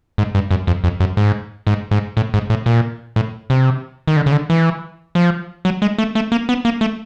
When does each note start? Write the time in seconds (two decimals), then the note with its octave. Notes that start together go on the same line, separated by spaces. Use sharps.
0.18 G#2
0.35 G2
0.51 F#2
0.67 F2
0.84 F2
1.00 F#2
1.17 G#2
1.67 G#2
1.91 G#2
2.17 A2
2.34 G#2
2.50 A2
2.66 A#2
3.16 A2
3.50 C3
4.08 D#3
4.16 D3
4.26 C#3
4.32 D3
4.50 E3
5.15 F3
5.65 F#3
5.82 G#3
5.98 A3
6.15 A3
6.32 A#3
6.49 B3
6.65 A#3
6.81 A3